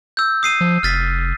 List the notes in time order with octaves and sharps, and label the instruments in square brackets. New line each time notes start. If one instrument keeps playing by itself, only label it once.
[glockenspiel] E6 G6
D#6 C7 D#7
[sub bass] F3
[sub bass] F1 [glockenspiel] F6 A6 B6